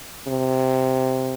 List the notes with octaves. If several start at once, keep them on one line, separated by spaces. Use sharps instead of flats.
C3